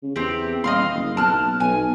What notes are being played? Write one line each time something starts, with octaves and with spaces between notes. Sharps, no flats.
C#3
E2 C4 G4
D#1 D#5 F5 C6
F#1
B1 A5 F6 F#6
B1 G#5